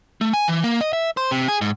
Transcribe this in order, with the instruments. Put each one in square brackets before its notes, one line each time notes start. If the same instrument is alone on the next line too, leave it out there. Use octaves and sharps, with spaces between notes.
[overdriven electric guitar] A3
G#5
E3
A#3
D#5
E5
C5
C3
G#4
G#2